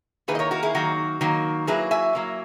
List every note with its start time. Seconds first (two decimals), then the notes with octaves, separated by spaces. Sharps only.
0.28 D#3 A#3 E4 G#4 B4
0.35 D#5
0.39 A#4 C#5
0.51 F#4 A#4
0.63 E4 G#4
0.75 D#3 F#3 A#3 F#4
1.21 D#3 F#3 A#3
1.67 F#3 A#3 E4 G#4 B4
1.91 E5 G#5
2.15 F#3 A#3 E4